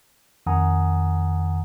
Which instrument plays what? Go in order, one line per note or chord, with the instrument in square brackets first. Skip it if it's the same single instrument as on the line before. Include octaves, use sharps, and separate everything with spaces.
[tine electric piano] F2 D#3 F#5 G#5 A#5 D#6